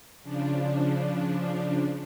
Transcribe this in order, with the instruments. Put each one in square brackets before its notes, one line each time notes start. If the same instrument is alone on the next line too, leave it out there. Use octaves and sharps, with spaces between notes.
[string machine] C#3 F3 D4